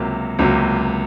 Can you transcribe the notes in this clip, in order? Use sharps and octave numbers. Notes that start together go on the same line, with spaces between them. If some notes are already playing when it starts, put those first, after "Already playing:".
Already playing: C#2 C3 F#3 A#3
C#2 C3 F#3 A#3